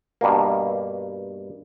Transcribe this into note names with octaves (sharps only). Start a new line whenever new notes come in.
G2 B2 A#3